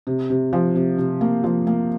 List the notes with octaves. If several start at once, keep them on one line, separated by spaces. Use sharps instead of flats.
C3
C3
F3
C3
C3
A#3
F3
A#3